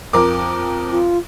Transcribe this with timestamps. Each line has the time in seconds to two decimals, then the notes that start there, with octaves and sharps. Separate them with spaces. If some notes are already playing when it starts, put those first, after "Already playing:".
0.13 F2 A#4 D6
0.91 F4